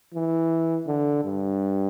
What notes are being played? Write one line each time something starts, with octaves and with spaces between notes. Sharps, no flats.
E3
D3
G2